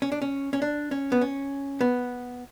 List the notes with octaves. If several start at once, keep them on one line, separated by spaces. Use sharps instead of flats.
C#4
D4
C#4
C#4
D4
C#4
B3
C#4
B3